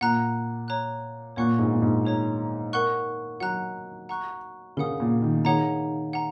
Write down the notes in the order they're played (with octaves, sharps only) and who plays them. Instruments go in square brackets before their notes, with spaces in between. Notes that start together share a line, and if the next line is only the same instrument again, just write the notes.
[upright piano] A#2 [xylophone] F#5 A#5 F#6
[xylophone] C#5 A#5 F#6
[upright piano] A#2 [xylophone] C#5 F#5 C#6 F#6
[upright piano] G#2
A#2
G#2
[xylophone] G#4 C#5 A#5
A#4 F#5 C#6 F#6
[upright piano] F#3 [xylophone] F#5 A#5 F#6
[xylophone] F#5 A#5 C#6 F#6
[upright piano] C#3 [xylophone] A#4 F#5 D#6
[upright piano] A#2
D#3
[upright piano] D#3 [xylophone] G#4 C#5 F#5 A#5
[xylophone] F#5 A#5